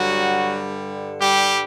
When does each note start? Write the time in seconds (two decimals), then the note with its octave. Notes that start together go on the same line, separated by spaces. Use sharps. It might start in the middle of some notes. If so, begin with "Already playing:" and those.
Already playing: G2 D3 F#3 G3 F#4
1.21 G3 G4